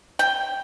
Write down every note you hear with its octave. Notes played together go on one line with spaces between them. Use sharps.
G5